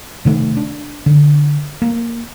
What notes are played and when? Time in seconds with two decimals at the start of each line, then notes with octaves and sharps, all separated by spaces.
0.25 C3 D#3 A3
0.57 D4
1.06 D3
1.82 A#3